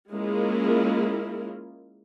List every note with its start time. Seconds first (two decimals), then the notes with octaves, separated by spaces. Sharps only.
0.12 G#3 A#3 C#4 E4 F4 A#4